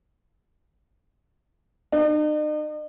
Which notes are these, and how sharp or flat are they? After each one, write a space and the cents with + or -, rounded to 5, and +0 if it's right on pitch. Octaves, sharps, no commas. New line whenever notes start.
D#4 -45